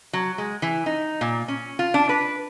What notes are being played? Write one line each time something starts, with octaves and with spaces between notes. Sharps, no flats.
F#3
G#3
E3
D#4
A#2
C#4
F4
D4
B4